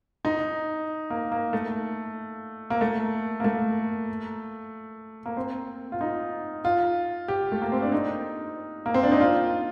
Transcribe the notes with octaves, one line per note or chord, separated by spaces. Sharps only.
D#4
A#3
A#3
A3
A#3
A3
A#3
A3
A#3
C4
F4
D#4
F4
G4
A3
A#3
C4
D4
D#4
A#3
C4
D4
D#4
F4